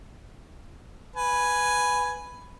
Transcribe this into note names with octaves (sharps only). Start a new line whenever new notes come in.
B4 G#5